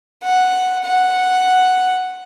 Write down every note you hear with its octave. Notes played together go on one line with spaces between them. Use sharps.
F#5
F#5